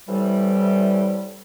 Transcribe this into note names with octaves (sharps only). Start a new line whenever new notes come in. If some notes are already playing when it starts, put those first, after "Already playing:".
A2 C3 E3 G3